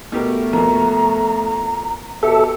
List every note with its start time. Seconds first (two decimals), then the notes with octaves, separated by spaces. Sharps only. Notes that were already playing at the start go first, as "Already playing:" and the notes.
0.12 B2 A3 G4 A#4
0.53 F2 B2 A#3 A#5
2.23 B2 G4 A4 E5